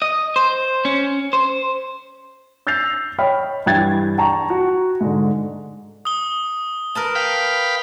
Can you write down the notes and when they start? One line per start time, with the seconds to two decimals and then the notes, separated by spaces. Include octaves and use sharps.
0.02 D#5
0.36 C5
0.85 C#4
1.33 C5
2.67 E6 G6 A6 A#6 C7 F7
3.19 C#5 D#5 G5 B5 F6
3.66 G2 E3 G5 G#6 A6
4.18 G5 A5 A#5 C#6
4.50 F#4
5.01 G#2 D3
6.05 D#6 G7
6.95 A#4 B4 A5
7.15 F5 G5 B5